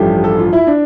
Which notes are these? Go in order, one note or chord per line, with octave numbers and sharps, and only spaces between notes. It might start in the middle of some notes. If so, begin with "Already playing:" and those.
Already playing: A1 G2 F3 A3 G4
A4
F4
E4
D4